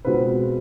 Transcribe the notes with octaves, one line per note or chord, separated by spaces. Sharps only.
B2 G#3 C4 F4 B4